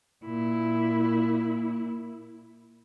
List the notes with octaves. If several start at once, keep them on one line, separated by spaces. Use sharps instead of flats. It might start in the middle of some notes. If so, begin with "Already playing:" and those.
A#2 E4